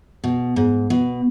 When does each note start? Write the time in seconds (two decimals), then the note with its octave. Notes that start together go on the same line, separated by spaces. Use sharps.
0.24 B2
0.56 G#2
0.90 B2